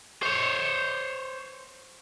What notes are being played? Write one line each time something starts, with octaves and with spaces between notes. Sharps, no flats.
C5 C#5